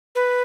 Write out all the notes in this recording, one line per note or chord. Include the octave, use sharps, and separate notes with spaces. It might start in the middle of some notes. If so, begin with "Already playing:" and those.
B4